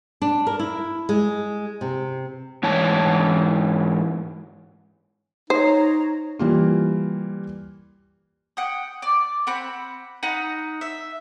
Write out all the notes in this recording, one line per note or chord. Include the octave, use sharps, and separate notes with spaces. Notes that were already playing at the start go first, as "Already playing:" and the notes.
D4
A#4
E4
G#3
C3
G#2 E3 C#5 A5
D#4 C5 C#5 A#5
E3 G3 A#3 F4
F#5 G5 D#6
D5
C4 F#5 B5
D#4 B4 F#5 A#5
E5